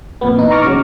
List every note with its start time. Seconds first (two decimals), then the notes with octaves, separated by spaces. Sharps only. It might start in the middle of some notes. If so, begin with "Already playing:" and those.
0.21 F2 A#2 B3
0.36 E3 D#4
0.51 A#5 C#6 D6 F6 A6 A#6
0.64 C#3 F#3